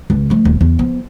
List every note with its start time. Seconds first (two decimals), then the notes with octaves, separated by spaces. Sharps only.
0.10 C#2
0.30 F3 A3
0.45 D#1
0.61 E2
0.79 F3 B3